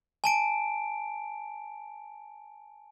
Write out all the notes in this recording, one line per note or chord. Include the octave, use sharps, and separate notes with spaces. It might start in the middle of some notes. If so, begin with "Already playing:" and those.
G#5 A5 D7